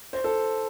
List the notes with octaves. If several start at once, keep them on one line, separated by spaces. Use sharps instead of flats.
C5
A4